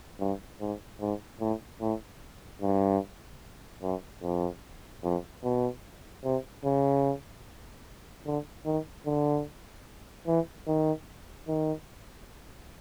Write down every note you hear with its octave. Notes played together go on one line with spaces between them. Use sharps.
G2
G#2
G#2
A2
A2
G2
F#2
F2
F2
B2
C3
C#3
D3
D#3
D3
E3
D#3
D#3